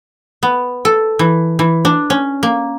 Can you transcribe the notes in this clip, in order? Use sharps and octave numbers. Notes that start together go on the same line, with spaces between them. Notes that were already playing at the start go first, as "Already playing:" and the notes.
B3
A4
E3
E3
D4
C#4
A#3